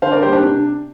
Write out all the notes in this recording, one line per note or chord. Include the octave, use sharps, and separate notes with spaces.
D3 C5 F5
A#4 D5
G3 A#3 G4 C5
D4 G4
C3 D4